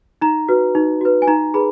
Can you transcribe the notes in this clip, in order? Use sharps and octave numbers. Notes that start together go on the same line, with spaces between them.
D#4 A#5
F#4 B4
D#4
F#4 B4
G#5
D#4 A#5
G#4 B4 B5